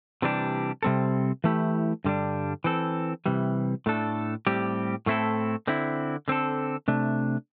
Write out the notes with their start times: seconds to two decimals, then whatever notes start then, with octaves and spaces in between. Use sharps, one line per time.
0.22 C3 E3 G3 D4 G4
0.83 C3 G3 C4 A4
1.44 E3 A3 E4 G4
2.04 G2 D3 G3 D4
2.64 E3 C4 A4
3.26 C3 E3 G3
3.86 A2 A3 D4 A4
4.47 A2 G3 C4 G4
5.06 A2 A3 C4 E4 A4
5.67 D3 C4 E4
6.28 D3 C4 A4
6.88 C3 A3 D4